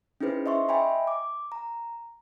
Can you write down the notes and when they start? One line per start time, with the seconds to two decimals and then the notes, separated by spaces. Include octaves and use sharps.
0.21 C#4 D#4 E4 G#4 B4 C5
0.46 D#5 E5 C6 C#6
0.69 D#5 E5 G5 G#5 B5
1.07 D6
1.52 A#5